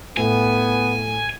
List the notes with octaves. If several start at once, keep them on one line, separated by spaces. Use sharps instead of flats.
A2 B3 G#5